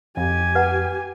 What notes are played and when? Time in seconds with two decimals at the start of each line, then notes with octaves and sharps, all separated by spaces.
0.17 F2 G4 G#5
0.55 B4 F#5 A#5